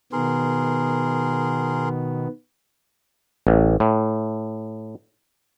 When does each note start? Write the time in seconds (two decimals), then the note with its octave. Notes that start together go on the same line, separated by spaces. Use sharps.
0.13 B2 D#3 B3 G#4 A#4 C6
3.47 A1
3.80 A2